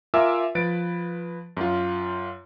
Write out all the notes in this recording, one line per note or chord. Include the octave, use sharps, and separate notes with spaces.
F4 A#4 E5 G#5 D6 E6
F3 B4 A6 D7
F#2 F4